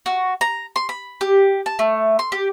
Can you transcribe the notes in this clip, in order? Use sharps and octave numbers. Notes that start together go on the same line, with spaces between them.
F#4
A#5
C6
B5
G4
A5
A3
C6
G4